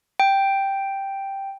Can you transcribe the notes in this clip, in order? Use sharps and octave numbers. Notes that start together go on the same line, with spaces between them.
G5